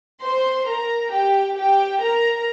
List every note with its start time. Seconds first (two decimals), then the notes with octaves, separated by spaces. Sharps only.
0.22 C5 C6
0.66 A#4 A#5
1.12 G4 G5
1.56 G4 G5
2.01 A#4 A#5